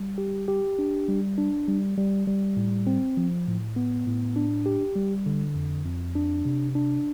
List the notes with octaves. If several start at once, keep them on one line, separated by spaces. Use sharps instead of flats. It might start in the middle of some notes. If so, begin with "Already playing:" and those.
Already playing: G3
G4
G4
D4
G3
D4
G3
G3
G3
A2
C4
F3
A2
B3
A2
D4
G4
G3
D3
F2
F2
D4
C3
D4